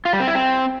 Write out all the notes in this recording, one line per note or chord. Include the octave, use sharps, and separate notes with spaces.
F4
G3
C4
E4
C4